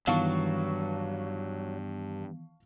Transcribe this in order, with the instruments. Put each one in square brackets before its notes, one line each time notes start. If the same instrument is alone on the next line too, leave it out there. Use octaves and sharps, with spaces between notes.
[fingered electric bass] G2 [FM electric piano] D#3 E3 B3 [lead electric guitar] F#3 [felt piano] F5 A5 C#6